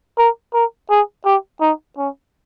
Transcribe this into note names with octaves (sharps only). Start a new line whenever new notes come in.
A#4
A#4
G#4
G4
D#4
C#4